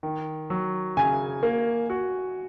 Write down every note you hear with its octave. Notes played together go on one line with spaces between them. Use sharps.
D#3
F#3
C#3 G#5
A#3
F#4